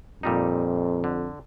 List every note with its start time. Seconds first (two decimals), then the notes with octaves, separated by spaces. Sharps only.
0.23 F2 A#2 G3 D#4
1.04 D3